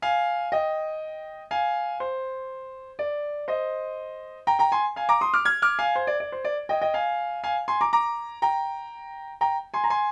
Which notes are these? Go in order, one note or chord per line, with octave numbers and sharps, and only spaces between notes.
F5 G#5
D#5 G5
F5 G#5
C5
D5
C5 D#5
G5 A#5
G5 A#5
G#5 C6
F5 G#5
A#5 D6
C6 D#6
D6 F6
F6 G#6
D6 F6
F5 G#5
C5
D5
D5
C5
D5
D#5 G5
D#5 G5
F5 G#5
F5 G#5
G#5 C6
A#5 D6
A#5 D6
G5 A#5
G5 A#5
G#5 C6
A#5
G#5 C6